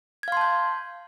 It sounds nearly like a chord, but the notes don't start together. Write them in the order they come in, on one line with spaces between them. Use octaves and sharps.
G#6 F5 C6 A5 G6